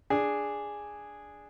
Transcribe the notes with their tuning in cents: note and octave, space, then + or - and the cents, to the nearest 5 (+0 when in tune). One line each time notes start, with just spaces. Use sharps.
D4 +0 G#4 -5